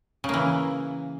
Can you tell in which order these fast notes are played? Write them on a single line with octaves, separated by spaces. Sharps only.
C#3 A#3 E3